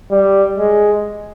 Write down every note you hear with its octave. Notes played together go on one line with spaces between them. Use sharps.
G3
G#3